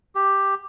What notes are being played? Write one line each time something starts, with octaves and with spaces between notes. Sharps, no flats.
G4